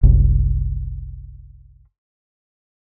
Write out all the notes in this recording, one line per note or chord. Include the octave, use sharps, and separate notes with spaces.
F#1 C2